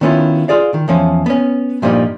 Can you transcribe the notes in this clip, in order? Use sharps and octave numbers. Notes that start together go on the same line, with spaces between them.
D#3 B3 C#4 E4 F4
F4 G#4 D5 F5
D#3
E2 F3 C#4
B3 C#4
G2 A#2 F3 G3 D#4